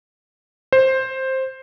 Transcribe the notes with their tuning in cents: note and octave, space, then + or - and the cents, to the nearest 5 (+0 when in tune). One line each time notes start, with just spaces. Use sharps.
C5 +10